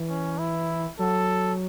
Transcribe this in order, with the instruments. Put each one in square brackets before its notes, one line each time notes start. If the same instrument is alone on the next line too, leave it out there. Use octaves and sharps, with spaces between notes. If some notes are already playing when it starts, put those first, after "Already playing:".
Already playing: [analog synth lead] E3
[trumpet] C#4
E4
[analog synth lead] F#3 [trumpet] A4